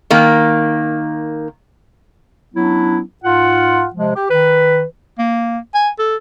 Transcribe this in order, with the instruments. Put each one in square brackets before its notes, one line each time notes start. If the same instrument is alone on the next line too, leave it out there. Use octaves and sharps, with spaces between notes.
[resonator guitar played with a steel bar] D#3 A#3
[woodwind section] F#3 B3 C#4 D4 E4
G#2 F4 F#5
C3 F3 G#3
G4
D#3 B4
[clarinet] A#3
G#5
A4